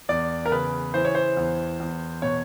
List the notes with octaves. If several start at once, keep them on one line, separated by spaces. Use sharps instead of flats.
E2 D5
A#4
C#3 B4
E3 C5
C#5
C5
E2
E2
B2 C#5